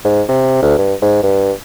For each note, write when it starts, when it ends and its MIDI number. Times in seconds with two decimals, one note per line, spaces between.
0.05 0.22 44
0.29 0.60 48
0.62 0.75 38
0.78 0.94 43
1.02 1.20 44
1.23 1.52 43